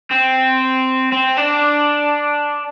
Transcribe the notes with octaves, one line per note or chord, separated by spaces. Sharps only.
C4
C4
D4